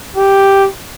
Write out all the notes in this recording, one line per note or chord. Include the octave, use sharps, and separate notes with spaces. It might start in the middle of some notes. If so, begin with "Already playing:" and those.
G4